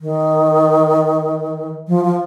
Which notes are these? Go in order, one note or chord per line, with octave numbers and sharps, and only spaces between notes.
D#3
F3
F3